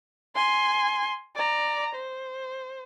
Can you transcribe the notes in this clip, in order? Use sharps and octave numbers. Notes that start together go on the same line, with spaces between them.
G#5 C6
D5 A#5
C5